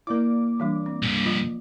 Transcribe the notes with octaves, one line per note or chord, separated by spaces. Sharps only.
A#3 E4 A#4 D5 D6
E3 G3 D4
C4
C2 G2
F3 F4